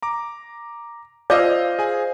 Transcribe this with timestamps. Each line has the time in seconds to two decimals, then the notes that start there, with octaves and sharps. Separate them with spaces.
0.02 A#5 D6
1.30 F4 C5 D5 D#5 F5 E6 G6
1.79 G#4 G#5